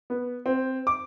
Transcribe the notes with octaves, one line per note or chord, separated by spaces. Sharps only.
B3
C4
D6